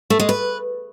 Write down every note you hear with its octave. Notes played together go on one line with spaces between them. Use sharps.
A3
G#3
B4